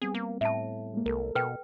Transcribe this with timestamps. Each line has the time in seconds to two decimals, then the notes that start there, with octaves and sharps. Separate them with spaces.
0.02 G3 B3 C4 G#4
0.15 A#3
0.41 A2 E5 A5
0.93 G#3 A#3
1.06 C2 A4 A#4
1.35 B2 B4 G5